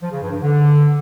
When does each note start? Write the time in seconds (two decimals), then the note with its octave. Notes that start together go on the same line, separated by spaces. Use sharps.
0.02 F3
0.12 C#3
0.22 G2
0.32 G2
0.42 D3